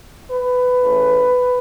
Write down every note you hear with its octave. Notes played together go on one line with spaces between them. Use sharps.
B4
C#3 E3 A3